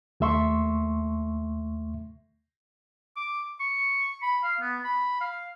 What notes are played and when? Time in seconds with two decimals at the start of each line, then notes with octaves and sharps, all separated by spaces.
0.20 D#2 A3 E5 C6 C#6
3.16 D6
3.60 C#6
4.22 B5
4.44 F5
4.61 B3
4.84 B5
5.21 F5